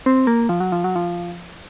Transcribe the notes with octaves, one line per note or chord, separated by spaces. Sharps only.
C4
A#3
F3
F#3
F3
F#3
F3